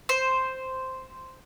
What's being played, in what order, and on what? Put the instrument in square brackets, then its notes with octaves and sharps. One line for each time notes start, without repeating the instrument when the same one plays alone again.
[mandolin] C5